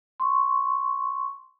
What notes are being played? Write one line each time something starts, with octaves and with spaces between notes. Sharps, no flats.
C6 C#6